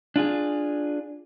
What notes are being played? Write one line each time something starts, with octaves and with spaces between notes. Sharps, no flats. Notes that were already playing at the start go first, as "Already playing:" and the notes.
D4 F4 G#4